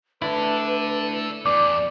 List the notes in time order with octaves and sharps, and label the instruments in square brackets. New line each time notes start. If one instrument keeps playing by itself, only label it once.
[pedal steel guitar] A3 D4 E4 [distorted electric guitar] A4 D5 [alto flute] B4
[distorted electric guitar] E2 [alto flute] D5 [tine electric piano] D6